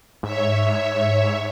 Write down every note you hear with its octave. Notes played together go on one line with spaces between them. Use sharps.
G#2 C#5 E5